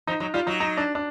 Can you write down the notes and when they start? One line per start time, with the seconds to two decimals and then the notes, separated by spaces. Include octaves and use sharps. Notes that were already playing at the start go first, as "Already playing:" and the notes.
0.07 F3 D#4
0.20 F#3 D#4
0.34 G3 F4
0.47 F#3 D#4
0.60 D#4
0.78 D4
0.95 D4